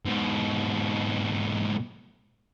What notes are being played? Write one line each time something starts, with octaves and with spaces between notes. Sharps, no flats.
G#2 B2